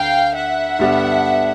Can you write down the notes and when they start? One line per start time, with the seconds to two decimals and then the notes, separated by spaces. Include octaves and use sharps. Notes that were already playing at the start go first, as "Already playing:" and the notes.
Already playing: D2 D3 D4 F5 G5
0.36 E5 F#5
0.79 G2 D3 G3 B3 D4